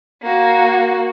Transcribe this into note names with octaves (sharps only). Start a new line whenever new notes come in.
A#3 F#4